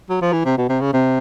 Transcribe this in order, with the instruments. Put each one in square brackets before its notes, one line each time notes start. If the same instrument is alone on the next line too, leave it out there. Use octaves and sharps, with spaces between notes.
[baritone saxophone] F#3
F3
E3
C3
B2
C3
C#3
C3